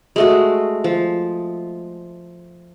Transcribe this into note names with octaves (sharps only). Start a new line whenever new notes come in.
G#3 A3 F#4
F3